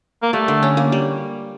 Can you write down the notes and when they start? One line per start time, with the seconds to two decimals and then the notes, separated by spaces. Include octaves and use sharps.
0.22 A#3
0.33 G3 A3
0.48 D3
0.63 C#4
0.77 A#3
0.92 G3